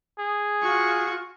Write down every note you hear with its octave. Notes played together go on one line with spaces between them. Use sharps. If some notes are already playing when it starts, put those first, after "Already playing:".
G#4
F4 F#4 C#6